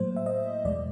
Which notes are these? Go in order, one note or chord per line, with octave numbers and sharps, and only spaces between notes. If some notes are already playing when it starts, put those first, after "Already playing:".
Already playing: A2 F#3 A#3 C5
E5
D#5
E2 B2 G#3 D5